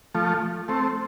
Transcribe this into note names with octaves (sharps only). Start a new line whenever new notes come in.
F3 A3
A3 C4